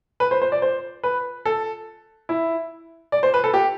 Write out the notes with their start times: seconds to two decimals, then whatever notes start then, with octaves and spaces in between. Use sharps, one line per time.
0.20 B4
0.31 C5
0.42 C5
0.52 D5
0.62 C5
1.03 B4
1.45 A4
2.29 E4
3.12 D5
3.23 C5
3.34 B4
3.44 A4
3.54 G4